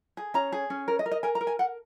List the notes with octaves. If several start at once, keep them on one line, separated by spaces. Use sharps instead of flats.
G#4
C#4 A#5
G#4
C#4
A#4
D#5
A#4
D#5
A#4 G#5
A#5
A#4
G#5
A#4 F#5